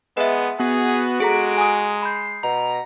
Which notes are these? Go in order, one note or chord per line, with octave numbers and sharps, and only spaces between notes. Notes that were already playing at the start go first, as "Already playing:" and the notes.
G#3 B3 B4 E5
B3 F#4 G#4
G#3 G#4 A4 A#5 D7
G#5 A#5 D#6
B5 G6 C7
B2 A#5